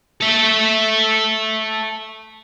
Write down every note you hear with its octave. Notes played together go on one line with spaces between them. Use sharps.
A4 E5